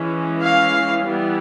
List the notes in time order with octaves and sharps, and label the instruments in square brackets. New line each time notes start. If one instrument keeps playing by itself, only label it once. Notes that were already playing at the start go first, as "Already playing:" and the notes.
Already playing: [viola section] E3 G#3 C#4
F5
E3 G3 B3